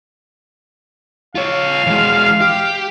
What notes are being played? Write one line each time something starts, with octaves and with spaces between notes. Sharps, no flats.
F4 C#5 F5
E3 G#3
G4